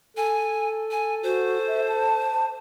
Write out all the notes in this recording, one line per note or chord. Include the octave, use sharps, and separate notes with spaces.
A4 G#5
G#5
F#4 C5
E5
A5